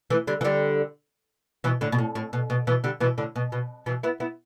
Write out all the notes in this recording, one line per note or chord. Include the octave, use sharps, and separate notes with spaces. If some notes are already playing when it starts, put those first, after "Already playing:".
E3 A3
D3 G3
E3
D3 G3
B2 E3
A2 D3
B2
A2
A2
B2
B2
B2 E3
D3 G3
B2 E3
A2 D3
B2
B2
B2 E3
B3 E4
B3 E4